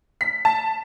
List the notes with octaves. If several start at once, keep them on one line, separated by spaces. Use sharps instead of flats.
B6
A5